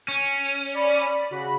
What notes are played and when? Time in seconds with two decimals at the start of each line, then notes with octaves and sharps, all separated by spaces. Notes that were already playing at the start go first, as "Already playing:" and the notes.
0.08 C#4
0.73 D5 B5
1.30 C#3 F#4 B5